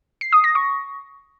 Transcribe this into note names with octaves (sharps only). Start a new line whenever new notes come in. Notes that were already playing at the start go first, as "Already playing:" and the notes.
C7
D#6
A#6
C#6